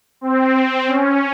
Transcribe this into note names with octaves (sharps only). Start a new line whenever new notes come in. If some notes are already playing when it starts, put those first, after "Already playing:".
C4
C#4